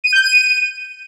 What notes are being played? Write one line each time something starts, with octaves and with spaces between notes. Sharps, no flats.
D#7
G6
D#7